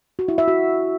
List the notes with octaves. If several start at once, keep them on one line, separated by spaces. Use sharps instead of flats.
F#4
E4
E5
F#4